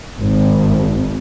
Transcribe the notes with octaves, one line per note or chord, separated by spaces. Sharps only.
G#1